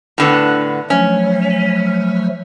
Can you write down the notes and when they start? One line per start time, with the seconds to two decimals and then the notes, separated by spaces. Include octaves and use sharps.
0.18 A2 D3 B3
0.90 F3 F#3 A3 C#4